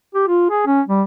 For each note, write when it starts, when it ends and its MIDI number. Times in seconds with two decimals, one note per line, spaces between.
0.15 0.25 67
0.28 0.47 65
0.50 0.65 68
0.67 0.81 61
0.88 1.02 55